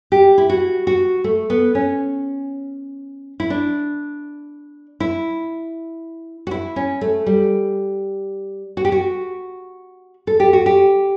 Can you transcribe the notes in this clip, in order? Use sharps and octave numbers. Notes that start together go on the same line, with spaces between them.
G4
E4
F#4
F#4
A3
B3
C#4
E4
D4
E4
F#4
E4
C#4
A3
G3
F#4
G4
F#4
A4
G4
F#4
G4